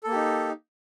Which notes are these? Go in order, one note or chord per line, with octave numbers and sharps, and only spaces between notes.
A#3 D#4 G4 A4